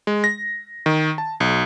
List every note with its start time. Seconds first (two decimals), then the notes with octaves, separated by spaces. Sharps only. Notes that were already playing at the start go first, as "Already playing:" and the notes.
0.07 G#3
0.24 A#6
0.86 D#3
1.18 A5
1.40 B1